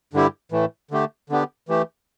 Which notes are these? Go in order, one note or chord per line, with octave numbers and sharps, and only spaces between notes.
G2 D3 G3 E4 G4
A2 E3 A3
D3 A3 G4
D3 B3 D4 G4
E3 A3 G4